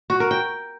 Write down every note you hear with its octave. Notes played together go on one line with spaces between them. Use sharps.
F#4
A#4
G5